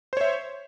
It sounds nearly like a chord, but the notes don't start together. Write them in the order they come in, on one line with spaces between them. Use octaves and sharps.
C5 C#5 E5